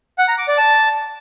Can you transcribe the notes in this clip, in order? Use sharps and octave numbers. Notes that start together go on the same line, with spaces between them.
F#5
A#5
D6
D5
A5